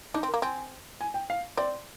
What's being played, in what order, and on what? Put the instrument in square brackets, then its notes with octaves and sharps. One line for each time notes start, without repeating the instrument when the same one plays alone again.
[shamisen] D4 [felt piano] D#4
[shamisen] C4
[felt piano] A#4
[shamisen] A#3
[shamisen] C4 [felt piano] G#5
[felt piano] G#5
G5
F5
[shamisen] C4 [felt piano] D5